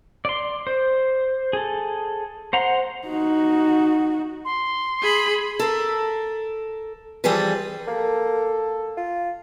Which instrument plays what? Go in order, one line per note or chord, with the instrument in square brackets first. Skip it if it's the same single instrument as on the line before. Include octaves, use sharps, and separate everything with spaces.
[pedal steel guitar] D5 C6
C5
G#4 A4
C5 F#5 A#5 C6
[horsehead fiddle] D#4 F#4
[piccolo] C6
[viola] G#4 B5
[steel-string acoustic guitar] A4 A#4
E3 F3 G3 G#4 A4 B4
[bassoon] A#3 [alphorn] A4
[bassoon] F4